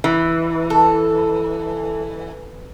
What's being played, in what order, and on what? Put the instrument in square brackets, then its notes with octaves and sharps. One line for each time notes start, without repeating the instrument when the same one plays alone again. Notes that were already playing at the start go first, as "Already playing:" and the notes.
[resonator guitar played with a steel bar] E3
[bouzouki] A4